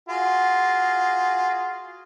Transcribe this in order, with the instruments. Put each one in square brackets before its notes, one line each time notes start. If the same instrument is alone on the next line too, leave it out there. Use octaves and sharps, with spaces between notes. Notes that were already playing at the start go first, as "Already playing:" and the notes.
[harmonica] F4 F#4 G#4